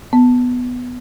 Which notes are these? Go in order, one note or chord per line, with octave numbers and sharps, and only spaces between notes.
B3